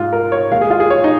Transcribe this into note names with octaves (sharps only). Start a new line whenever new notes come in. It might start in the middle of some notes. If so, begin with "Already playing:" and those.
Already playing: G#2 G#3 F4
A#4
C#5
D#2 D#3 G#3 F5
G#4
F4
G#4
C#5
D#4